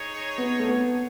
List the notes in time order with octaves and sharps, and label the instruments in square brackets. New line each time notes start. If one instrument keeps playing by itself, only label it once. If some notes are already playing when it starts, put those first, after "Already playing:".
Already playing: [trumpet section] D#4 G#4 C#5
[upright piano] B3
A3
B3